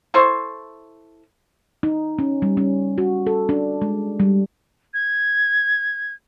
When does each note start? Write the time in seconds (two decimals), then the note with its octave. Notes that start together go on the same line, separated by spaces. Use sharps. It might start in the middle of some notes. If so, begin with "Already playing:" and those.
0.14 E4 A4 C5 C#6
1.83 D#4
2.19 C#4
2.42 G3
2.57 C#4
2.98 F#4
3.27 A4
3.49 D4
3.82 G#3
4.20 G3
4.94 G#6